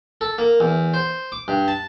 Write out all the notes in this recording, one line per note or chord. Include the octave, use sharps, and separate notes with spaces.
A4
A#3
E2
C5
D6
G2
A5